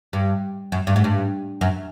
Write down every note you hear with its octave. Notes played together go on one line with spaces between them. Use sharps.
G2
F#2
G2
G#2
G2
F#2